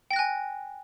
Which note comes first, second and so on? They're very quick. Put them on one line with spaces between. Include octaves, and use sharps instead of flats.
G5 A#6 F#6 G#5